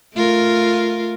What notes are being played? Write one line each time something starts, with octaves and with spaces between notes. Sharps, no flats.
A3 F4 A#4